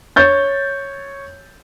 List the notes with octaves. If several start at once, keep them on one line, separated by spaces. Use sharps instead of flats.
C#5 G6 A6